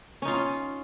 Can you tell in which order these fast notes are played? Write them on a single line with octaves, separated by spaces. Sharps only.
C#4 D#4 F4